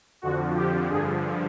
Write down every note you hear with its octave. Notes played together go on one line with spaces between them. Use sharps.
F2 D3 F3 F#4
G4
G2 D3 F3 G#4